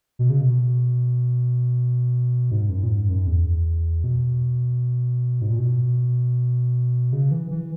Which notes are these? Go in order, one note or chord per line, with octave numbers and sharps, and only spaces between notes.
B2
C#3
B2
G#2
F#2
A#2
G#2
F#2
E2
B2
G#2
A#2
B2
C#3
E3
E3